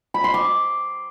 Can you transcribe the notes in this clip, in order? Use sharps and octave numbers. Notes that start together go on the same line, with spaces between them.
B5
C6
D6